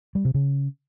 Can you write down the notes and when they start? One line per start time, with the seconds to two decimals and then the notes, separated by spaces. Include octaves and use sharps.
0.15 G3
0.25 C3
0.34 C#3